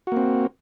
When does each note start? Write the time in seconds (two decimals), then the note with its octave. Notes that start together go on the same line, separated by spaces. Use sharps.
0.07 F#4
0.12 A#3
0.17 C4